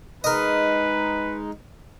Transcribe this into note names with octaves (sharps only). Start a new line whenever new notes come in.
G#3 D#4 A#4 B4 D#5